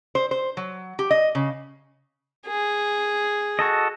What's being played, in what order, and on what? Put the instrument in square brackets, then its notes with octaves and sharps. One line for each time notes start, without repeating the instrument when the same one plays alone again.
[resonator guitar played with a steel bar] C5
C5
F#3
G4
D#5
C#3
[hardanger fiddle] G#4
[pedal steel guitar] F#4 A4 D#5